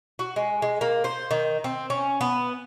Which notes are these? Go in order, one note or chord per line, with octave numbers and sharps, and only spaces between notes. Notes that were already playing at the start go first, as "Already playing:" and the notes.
F#4
G#3
G#3
A#3
C5
D#3
C4
C#4
B3